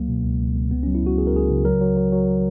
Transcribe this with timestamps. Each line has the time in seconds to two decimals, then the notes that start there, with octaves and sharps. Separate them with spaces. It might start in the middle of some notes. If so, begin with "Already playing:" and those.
Already playing: C#2 F#3 A#3
0.09 B2
0.24 C#2
0.40 C#2
0.55 C#2
0.71 C#2 B3
0.83 F#3 C#4
0.95 E4
1.03 C#2 F#4
1.18 C#2 G#4
1.27 A#4
1.34 C#2 G#4
1.50 C#3
1.65 F#3 A#4
1.81 F#3
1.97 F#3
2.13 F#3